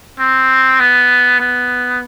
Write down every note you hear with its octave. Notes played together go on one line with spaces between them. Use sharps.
C4
B3
B3